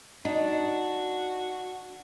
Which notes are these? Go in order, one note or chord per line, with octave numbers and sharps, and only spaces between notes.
D4 D#4 F#4